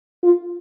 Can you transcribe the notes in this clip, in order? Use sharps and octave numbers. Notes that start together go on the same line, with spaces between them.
F4